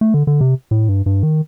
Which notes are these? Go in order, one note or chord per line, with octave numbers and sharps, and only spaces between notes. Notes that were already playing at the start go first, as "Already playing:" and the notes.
A3
D3
D3
C3
A2
G2
G2
D#3